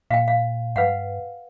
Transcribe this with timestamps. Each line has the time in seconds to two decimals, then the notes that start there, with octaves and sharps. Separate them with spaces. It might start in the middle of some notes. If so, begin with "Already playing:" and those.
0.11 A#2 F5 G5
0.28 F5
0.76 G2 B4 F5 F#5